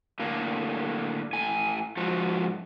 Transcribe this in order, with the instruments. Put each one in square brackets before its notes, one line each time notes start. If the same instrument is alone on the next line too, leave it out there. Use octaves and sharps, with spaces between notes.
[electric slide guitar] A2 D3 A#3
A2 G#5
G#2 F3 F4 F#4